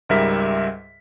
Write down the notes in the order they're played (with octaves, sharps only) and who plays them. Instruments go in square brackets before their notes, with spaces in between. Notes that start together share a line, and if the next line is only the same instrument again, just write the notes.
[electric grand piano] C#2 G#2 G3 A#4 E5 B6